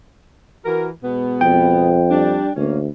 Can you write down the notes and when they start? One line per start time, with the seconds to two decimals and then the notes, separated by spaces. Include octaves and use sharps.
0.65 E3 F#4 A#4
1.02 B2 G#3 B3
1.41 F2 G5
2.11 G3 D4
2.56 D2 A#3 C#4